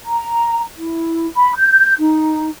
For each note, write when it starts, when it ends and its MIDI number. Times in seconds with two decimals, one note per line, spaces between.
0.06 0.61 82
0.77 1.27 64
1.36 1.52 83
1.56 1.93 91
1.99 2.49 63